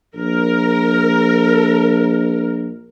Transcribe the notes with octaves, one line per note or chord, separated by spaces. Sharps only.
A#1 A#4